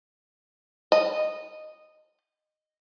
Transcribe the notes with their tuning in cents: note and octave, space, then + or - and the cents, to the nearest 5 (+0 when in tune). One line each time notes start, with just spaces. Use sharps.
D#5 -10